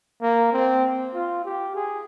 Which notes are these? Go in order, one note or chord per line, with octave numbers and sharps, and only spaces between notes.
A#3
C4
F4
G4
G#4